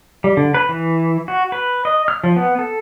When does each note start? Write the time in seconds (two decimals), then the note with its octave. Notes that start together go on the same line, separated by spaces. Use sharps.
0.24 G3
0.37 D3
0.54 B4
0.69 E3
1.28 F#4
1.52 B4
1.85 D#5
2.08 F6
2.24 F3
2.36 B3
2.59 A4